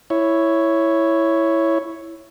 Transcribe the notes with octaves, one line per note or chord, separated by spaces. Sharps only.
E4 C#5